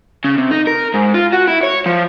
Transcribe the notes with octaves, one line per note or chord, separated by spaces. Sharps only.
C#3
C3
D#4
A#4
G#2
F4
F#4
E4
C#5
F3